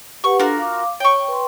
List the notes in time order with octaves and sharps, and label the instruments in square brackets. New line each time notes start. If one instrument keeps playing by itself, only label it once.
[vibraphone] G4 B4 F#5 [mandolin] C#6
[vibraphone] D4 A4 [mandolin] F4 F#4 A#4
[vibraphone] F5 D6
[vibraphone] C#5 [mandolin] G5 C#6
[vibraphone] B4 C6